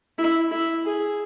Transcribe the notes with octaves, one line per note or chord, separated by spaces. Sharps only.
E4
E4
G#4